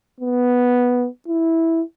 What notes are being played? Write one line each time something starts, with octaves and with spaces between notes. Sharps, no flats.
B3
E4